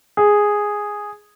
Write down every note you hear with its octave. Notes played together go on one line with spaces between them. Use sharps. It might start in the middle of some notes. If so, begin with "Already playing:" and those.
G#4